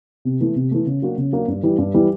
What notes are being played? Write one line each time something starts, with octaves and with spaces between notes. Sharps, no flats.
C3
E3 A3
C3
E3 A3
C#3
F#3 A#3 D4 F#4
C#3
F#3 A#3 D4 F#4
G2
E3 G3
G2
E3 G3